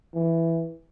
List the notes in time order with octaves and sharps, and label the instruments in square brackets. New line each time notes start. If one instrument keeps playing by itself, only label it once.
[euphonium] E3